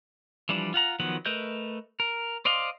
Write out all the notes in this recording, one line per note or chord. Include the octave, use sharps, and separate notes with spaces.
E3 F3 G3 D4
F4 F#5 A#5
D#3 F3 F#3 B3 F#5
A3 A#4 B4 D#5 G6
A#4
C5 D5 D#5 F5 C6